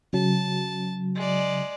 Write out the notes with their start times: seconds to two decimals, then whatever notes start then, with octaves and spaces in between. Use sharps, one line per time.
0.13 C#3 F#3 A5
1.16 G#3 D5